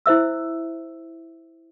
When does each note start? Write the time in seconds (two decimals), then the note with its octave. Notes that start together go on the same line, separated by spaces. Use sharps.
0.06 E4 C5 E5 E6